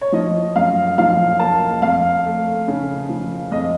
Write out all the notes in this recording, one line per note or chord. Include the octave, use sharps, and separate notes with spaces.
C#5
F3 D#5
F#2 F5
F3 F5
A#3 A5
F2 F5
A3
C#3
F3
F2 D#5